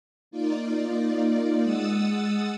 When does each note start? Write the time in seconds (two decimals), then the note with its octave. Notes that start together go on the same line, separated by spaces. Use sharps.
0.31 A#3 D#4 F4 D5
1.62 G#3 F#5 D#6 E6 A6